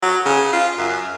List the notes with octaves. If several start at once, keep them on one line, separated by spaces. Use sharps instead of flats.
F#3
C#3
F4
F#2